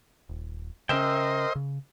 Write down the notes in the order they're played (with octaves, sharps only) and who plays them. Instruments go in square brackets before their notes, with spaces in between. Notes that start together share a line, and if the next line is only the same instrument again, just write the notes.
[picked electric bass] D#1
[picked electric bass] C#3 C#4 [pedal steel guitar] A#4 E5 G5 [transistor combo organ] C5 D#5
[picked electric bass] C#3